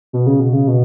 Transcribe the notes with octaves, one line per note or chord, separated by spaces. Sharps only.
B2
C#3
B2
C#3
B2